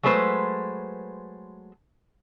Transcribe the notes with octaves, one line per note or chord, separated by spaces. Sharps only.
F#3 G#3 A3 B4 C5